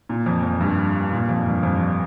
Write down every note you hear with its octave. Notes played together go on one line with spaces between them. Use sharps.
A#2
F2
F2
G2
A#2
F2
G2
F2